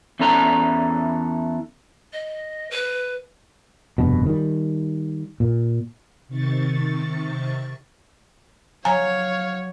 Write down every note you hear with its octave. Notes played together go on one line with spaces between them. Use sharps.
E2 E3 C#4 A4 D5 A#5
D#5
B4
F1 G2 B2
D#3 G3
A#2
C3 D#3 C#6 A6
F#3 C#5 F5 G#5 A#5